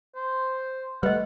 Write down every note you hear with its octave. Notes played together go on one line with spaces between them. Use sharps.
C5
G3 A3 B4 D#5 F#5